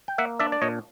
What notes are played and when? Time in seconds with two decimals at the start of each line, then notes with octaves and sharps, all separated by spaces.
0.08 G5
0.18 A#3 E5 F#5
0.39 D4 D5 E5
0.52 D5
0.62 A#2 C#5 D#5